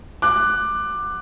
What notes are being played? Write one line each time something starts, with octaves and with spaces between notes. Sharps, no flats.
D6 F#6